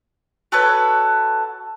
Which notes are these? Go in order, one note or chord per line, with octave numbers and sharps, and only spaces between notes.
F#4 A4 B4 C#5